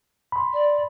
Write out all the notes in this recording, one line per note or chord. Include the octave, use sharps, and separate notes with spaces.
B5 C6
D5